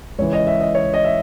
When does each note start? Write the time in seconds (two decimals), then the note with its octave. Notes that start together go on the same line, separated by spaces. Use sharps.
0.19 C#2 C#3 E3 C#5
0.33 D#5
0.47 E5
0.61 D#5
0.75 C#5
0.94 D#5
1.05 E5